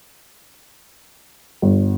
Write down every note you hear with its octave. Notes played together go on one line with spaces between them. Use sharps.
G1